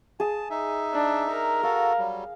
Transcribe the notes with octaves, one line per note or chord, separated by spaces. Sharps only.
G#4 A5
D#4 E5
D4
A#4
F#4 A4 F5
F#3 G3